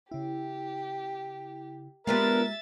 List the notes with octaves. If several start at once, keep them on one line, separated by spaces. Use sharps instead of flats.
C#3 E4 G4
G#3 B3 D4 F4 G4 A#4 E5 A6